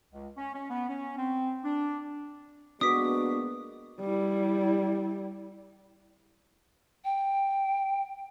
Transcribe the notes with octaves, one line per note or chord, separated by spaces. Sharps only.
C#2
C#4
C#4
B3
C#4
C4
D4
G#3 A#3 B3 D4 F#4 D6 D#6 B6
G3 E4
G5